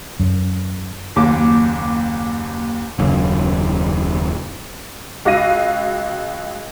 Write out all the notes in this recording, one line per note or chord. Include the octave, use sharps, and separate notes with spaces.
F#2
F#1 D#2 D6
D#1 F#2 C#3
C#2 F#4 F5 A#6 D#7